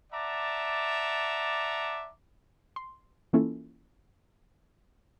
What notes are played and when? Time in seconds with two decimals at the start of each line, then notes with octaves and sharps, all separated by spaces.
0.12 D5 E5 F#5 A5 A#5 D6
2.76 C6
3.33 E3 A#3 C#4 E4 F4 A4